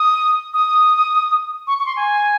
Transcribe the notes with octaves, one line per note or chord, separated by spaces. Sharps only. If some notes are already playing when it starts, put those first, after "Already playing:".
Already playing: D#6
D#6
C#6
C#6
C6
G#5